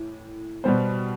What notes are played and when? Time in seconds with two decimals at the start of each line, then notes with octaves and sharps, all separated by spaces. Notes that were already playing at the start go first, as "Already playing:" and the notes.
Already playing: A2 E3
0.64 B2 G3 B3 C5